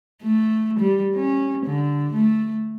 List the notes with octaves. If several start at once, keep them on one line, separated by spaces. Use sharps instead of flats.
A3
G3
C#4
D3
A3